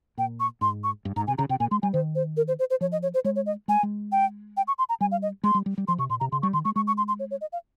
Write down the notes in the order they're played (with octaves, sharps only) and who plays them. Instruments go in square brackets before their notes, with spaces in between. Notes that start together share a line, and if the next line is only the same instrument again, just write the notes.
[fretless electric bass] A#2 [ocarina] G5
[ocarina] C#6
[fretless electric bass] G#2 [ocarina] C6
[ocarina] C#6
[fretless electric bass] G2
[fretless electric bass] G#2 [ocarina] A#5
[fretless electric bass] C3 [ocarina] G#5
[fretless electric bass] C#3 [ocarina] A#5
[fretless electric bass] C3 [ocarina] G5
[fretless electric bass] A#2 [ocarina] G#5
[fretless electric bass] G#3 [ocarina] C6
[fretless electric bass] G3 [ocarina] G#5
[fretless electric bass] D#3 [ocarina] C5
[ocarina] C5
A#4
C5
C5
C5
[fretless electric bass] F3 [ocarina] C#5
[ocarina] D#5
C#5
C5
[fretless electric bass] G#3 [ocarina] C#5
[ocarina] C#5
D#5
[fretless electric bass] G#3 [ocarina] G#5
[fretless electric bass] G#3
[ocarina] G5
G5
C#6
C6
A#5
[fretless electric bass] G3 [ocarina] G#5
[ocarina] F5
D#5
[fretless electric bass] G#3 [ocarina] C6
[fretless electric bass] G3
G3
G3
[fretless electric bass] F3 [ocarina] C6
[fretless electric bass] C3 [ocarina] C#6
[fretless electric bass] A#2 [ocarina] C6
[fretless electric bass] C3 [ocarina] A#5
[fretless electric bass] C#3 [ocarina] C6
[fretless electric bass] G3 [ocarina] C#6
[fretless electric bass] D#3 [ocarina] C6
[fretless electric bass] G#3 [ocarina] C#6
[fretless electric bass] G#3 [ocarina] C#6
[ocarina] C#6
C6
C6
C#5
C#5
D#5
F5